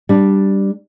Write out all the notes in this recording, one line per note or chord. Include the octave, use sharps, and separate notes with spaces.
G3 D4